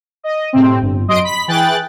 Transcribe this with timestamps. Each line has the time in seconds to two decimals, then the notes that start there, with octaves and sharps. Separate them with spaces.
0.23 D#5
0.53 A2 C3 C4
0.81 G1
1.08 F#2 D#5 C6 D#6 D7
1.24 B5 B6
1.48 E3 G#4 G5 F#6 A6